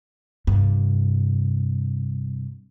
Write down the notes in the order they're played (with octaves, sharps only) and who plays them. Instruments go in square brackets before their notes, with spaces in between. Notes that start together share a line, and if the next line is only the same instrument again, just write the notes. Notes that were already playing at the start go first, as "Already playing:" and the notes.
[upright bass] G2 C3